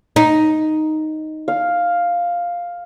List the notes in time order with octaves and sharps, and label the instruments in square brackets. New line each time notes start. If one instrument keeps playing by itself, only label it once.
[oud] D#4
[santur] F5